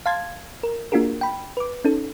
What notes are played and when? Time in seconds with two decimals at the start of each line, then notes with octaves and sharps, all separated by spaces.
0.06 F5 A5 C6 G#6 A6
0.63 A#4
0.92 A#3 D4 F4 F#4 G#4 A#4
1.21 G5 B5
1.57 B4 D6
1.85 C#4 D#4 A4